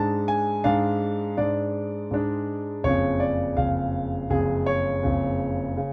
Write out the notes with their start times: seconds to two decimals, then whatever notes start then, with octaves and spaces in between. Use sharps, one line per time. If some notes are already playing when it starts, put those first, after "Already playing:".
Already playing: G#2 G#3 D4 A5
0.28 G#5
0.64 G#2 G#3 D4 F5
1.37 G#2 G#3 D4 D5
2.11 G#2 G#3 D4
2.84 F#1 F2 C#3 C#5
3.20 D5
3.57 F#1 F2 C#3 F5
4.30 F#1 F2 C#3 G#4
4.66 C#5
5.03 F#1 F2 C#3
5.77 C#3